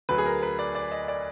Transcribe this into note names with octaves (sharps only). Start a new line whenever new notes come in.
D2 D3 F#3 B4
G#4
A#4
B4
D5
D5
D#5
D5